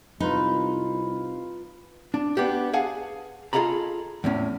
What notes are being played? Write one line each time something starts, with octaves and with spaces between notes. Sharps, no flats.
C2 D#4 F4 B4
D4
B3 D4 G4
G#4 F5 F#5 G#5 A5
F4 G#4 A4 D#5 A#5 B5
E2 A2 C#4